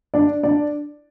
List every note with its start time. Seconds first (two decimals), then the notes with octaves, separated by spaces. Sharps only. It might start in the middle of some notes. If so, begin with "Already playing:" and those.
0.14 D4 D5
0.43 D4 D5